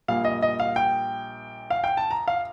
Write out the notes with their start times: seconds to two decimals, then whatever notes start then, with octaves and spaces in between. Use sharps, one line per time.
0.08 A#1 A#2 G3 F5
0.25 D#5
0.42 D#5
0.60 F5
0.76 G5
1.70 F5
1.84 G5
1.97 A5
2.11 A#5
2.28 F5